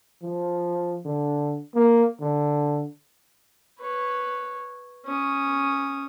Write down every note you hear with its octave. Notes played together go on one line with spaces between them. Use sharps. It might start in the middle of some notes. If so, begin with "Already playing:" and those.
F3
D3
A#3
D3
B4 C#5
C#4 D#6